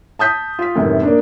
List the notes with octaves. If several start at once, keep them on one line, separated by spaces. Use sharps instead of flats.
A5 D#6 G6 B6
F4 B6
C#2 F#2 A2 C3 D#3
A#3 D4